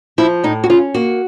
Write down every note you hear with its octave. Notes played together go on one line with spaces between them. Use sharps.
F3 E4
A2 D#4
F#4
C#4 F4
A#3 F#4